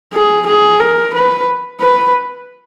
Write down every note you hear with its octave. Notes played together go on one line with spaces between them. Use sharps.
G#4
G#4
A#4
B4
B4